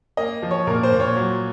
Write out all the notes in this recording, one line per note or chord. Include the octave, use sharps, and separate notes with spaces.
A#3 D#5
F3
C#5
A#2 A#4
C5
A#2
C#5
F#3